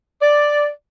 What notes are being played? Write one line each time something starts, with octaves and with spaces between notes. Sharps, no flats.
D5